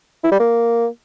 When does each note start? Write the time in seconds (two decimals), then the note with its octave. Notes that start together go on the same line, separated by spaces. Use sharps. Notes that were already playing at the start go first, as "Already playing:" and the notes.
0.24 E4
0.32 G3
0.40 A#3